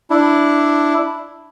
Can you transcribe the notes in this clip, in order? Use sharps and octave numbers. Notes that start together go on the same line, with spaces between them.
D4 E4